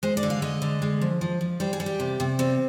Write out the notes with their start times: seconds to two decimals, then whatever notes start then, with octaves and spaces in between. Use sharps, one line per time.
0.03 G#3 C5
0.17 D5
0.23 D3
0.30 F5
0.42 G#3 D#5
0.62 D3
0.82 G#3
1.01 F3
1.21 F3
1.41 F3
1.60 G3 C5
1.73 G#4
1.80 G3
1.86 G4
2.00 C3
2.20 C3
2.39 G3 C4